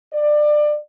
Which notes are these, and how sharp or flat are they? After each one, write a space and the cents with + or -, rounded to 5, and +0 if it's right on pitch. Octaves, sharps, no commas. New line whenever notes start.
D5 +25